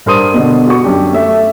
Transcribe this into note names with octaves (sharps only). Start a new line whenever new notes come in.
G2 A#4 C5 C6 D#6 D#7
B2 D3
F#4 C#6
F#2 D4 G4
A3 E5